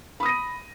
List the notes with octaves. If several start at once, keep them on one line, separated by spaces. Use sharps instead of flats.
B5 D#6 A#6 D#7